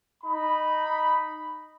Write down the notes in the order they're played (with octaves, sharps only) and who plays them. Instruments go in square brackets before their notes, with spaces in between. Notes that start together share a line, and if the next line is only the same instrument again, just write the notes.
[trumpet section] D#4 B5